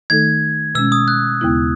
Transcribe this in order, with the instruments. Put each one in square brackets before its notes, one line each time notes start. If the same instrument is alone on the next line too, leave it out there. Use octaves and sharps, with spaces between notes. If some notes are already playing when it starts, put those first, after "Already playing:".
[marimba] D#3 A3 D#4 A4 [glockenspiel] G#6
[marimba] B2 G#3 C#4 [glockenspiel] E6
[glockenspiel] D#6
F#6
[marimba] D#2 C#3 G#3 B3 E4